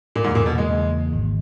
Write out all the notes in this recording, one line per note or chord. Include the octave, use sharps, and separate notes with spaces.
A#2
E2 G#2 C#3 E3 A#3
A#2
B2
G#3
E2 C#3 E3 A#3
G#1 G#2 D#3